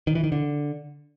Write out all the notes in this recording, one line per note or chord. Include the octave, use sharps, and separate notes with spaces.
D#3
E3
D#3
D3